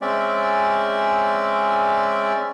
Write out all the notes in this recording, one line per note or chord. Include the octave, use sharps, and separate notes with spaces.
G#3 C4 C#4 D5 E5